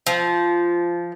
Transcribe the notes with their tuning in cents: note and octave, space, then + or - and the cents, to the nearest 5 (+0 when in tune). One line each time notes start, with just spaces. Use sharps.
F3 -10